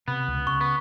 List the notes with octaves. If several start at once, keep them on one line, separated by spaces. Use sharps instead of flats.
C3 B3
C#2
C#3 C#6
B3